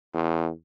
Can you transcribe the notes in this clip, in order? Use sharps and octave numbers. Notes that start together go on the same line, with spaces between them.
E2